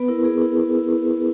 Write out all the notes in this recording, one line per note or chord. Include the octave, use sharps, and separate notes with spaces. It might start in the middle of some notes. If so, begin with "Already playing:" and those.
Already playing: B3 B4
E4 A#4
B3 G#4
E4
B3
E4